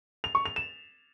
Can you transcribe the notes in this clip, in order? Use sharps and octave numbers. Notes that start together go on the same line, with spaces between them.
F7
C#6
F7
E7